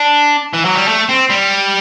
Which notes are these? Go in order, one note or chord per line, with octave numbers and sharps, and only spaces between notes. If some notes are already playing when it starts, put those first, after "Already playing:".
Already playing: D4
E3
F#3
G3
A3
C4
G3